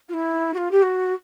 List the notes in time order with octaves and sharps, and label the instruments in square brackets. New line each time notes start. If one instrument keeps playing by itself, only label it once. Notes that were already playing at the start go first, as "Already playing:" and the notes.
[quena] F4
E4
F#4
F4
G4
F#4